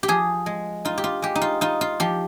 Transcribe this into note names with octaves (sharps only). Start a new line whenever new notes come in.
G4
F3 G#4
G#3
D#4 F4
G4
F4
G#3 G4
D#4
F4
D#4 F4
F4
F3 G4